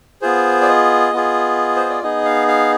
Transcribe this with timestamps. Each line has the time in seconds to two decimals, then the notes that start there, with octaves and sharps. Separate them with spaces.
0.22 B3 F4 G#4 C5
0.62 D5
0.68 D#5
1.13 B3 F4 G#4
1.76 C5
1.90 D5
2.03 B3 D#4 G#4 D#5
2.25 F5
2.48 F5